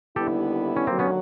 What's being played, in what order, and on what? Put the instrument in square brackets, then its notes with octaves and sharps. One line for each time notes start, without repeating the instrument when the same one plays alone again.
[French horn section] D#2 D3 G3 B3 E4 [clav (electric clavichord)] G4 A4
[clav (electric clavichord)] C#4
[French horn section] D#2 D3 F#3 [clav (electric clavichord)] A#3 C4
[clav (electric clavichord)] B3 C#4